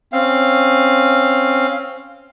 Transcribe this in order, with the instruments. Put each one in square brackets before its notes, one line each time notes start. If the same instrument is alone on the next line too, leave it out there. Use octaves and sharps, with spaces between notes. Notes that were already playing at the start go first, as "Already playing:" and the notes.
[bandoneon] C4 C#4 F5